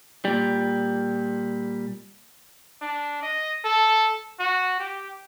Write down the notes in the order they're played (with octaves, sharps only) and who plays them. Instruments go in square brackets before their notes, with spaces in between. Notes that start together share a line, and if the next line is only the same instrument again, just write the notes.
[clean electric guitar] A#2 G3
[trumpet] D4
D#5
A4
F#4
G4